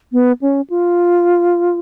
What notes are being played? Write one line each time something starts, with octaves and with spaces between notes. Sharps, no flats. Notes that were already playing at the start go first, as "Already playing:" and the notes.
B3
C#4
F4